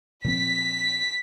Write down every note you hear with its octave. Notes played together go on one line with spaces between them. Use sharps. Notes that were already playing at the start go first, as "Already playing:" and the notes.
A#2 F3 C4 B6